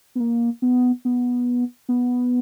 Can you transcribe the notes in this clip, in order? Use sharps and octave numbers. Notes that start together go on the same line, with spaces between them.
B3
A#3
B3
B3
B3